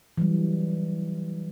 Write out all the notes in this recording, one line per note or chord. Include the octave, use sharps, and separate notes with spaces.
E3 F#3 G3